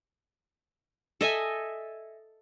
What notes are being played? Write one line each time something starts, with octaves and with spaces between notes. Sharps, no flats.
A4 D#5 E5 G#5